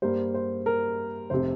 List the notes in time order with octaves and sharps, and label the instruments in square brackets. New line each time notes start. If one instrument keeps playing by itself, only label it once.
[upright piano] G2 G3 A#3 C5
C5
A#4
F1 C3 C5